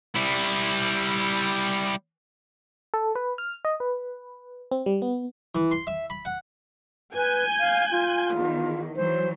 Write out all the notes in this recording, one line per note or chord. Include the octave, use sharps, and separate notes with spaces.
G3 E4
A4
B4
F6
D#5
B4
C4
G3
B3
E3
C6
E5
B5
F#5
B4 G#5 G6
F5
F4
E2 D#3
E3 F#3 C5